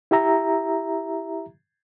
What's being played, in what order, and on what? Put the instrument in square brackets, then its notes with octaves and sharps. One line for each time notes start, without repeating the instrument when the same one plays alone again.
[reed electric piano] E4 G4 E5 A#5